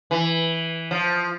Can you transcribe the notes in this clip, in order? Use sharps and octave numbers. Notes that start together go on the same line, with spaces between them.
E3
F3